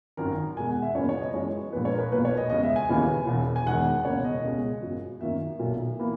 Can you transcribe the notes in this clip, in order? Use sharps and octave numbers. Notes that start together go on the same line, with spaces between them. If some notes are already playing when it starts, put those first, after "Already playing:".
G#1 F#2 D#3 A#4
E2 B2 G#3 G#5
F#5
E5
F#2 C#3 E3 A#3 C#5
C#5
D#5
F#2 E3 G#3 C#5
A#1 A#2 G#3 B4
C#5
A#4
B4
B1 A#2 F#3 A#3 B4
C#5
D#5
E2 C#3 G#3 D#5
E5
G#5
D#2 C#3 E3 A#3
E1 E2 B2
G#5
E1 E2 D#3 G#3 F#5
C#2 B2 A#3 C#5
D#5
C#2 B2 G#3
F#1 F#2 C#3 F#3
F#2 D#3 F#3 A#3 E5
B1 A#2 F#3 A#3
E3 A#3